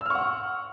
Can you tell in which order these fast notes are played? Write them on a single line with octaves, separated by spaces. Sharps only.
E6 F6 C#6 F#5